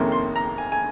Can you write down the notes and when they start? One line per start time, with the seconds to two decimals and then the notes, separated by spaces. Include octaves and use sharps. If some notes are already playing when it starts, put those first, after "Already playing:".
Already playing: F2 C3 D#3 A#3 C#4 C6
0.12 C6
0.36 A#5
0.58 G#5
0.72 G#5